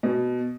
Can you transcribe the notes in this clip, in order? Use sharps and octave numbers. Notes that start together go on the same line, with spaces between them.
B2